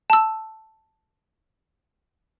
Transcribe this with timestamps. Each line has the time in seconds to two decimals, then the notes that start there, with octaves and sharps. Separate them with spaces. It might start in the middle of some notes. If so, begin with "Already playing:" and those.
0.10 A5 E6